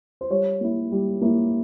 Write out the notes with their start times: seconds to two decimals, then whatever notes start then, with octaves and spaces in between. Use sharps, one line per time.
0.21 C5
0.30 G3 C#5
0.61 A#3 E4
0.92 G3
1.21 A#3 E4